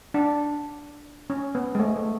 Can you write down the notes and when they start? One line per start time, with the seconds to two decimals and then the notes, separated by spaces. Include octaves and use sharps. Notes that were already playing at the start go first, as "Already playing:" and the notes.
0.14 D4
1.30 C#4
1.55 B3
1.75 G#3
1.79 A3
1.96 A3